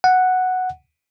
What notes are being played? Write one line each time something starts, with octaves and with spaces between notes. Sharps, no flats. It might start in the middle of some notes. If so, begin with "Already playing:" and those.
F#5